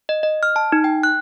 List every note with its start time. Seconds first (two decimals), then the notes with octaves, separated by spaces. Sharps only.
0.09 D#5
0.23 D#5
0.43 F6
0.56 A5
0.72 D#4
0.84 G5
1.03 F#6